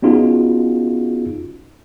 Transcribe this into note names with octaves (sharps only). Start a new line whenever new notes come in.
B3 C#4 D#4 F4 F#4 G#4